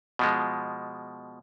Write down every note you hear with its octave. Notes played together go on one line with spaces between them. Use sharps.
B2 F3 G#3